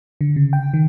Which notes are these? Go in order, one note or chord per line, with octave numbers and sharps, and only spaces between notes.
D3
C#3
G5
D#3